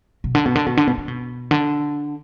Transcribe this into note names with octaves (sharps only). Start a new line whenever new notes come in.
B2
D3
B2
D3
B2
D3
B2
D3
B2
D3